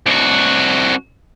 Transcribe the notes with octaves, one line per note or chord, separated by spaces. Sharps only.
C2 F#4